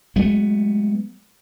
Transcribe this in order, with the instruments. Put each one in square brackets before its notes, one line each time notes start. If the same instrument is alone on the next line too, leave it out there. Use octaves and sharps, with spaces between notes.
[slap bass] F#3 G#3 A3 B3